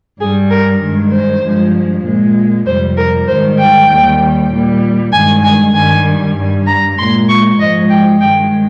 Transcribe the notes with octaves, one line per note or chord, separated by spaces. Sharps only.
G2 G3 G#4
A#4
G2 D#3 G#3
C5
G2 F3 G#3
A#2 G#3
F2 C3 G3 C5
A#4
G#2 D#3 G3 C5
G5
D#2 D#3 G3
A#2 G3
G2 D#3 G#3 G#5
G#5
G2 D#3 G3 G#5
G2 G3
A#5
A#2 G#3 C6
C#6
G#2 F3 G#3 D#5
G5
G2 D#3 G#3 G5